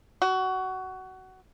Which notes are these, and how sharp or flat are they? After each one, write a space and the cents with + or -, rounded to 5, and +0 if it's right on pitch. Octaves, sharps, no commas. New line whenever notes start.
F#4 +20